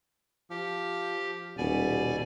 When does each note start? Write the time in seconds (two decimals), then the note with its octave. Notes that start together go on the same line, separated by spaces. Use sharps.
0.50 F3 G4
1.58 D#1 B2 D5 G#5